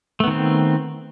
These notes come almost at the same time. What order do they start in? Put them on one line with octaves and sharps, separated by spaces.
A3 B3 D#3 C4